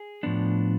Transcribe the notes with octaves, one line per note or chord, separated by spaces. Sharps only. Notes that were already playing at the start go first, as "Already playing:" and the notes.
Already playing: G#4
A2 F3 B3 D4